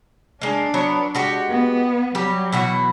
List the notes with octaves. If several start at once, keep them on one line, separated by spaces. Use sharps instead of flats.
G#3 A#3 D4
F#3 B3 C#5
G#3 F#4 G4
B3
F#3 G3 G4
B2 E3 F#4